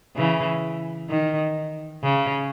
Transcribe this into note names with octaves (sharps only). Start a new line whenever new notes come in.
C#3 E3
D#3
C#3